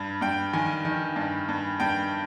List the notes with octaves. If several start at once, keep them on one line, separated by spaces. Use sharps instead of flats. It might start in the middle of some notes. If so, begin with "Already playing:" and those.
Already playing: G2
G2 G5
D#3 G#5
D#3
G2
G2
G2 G5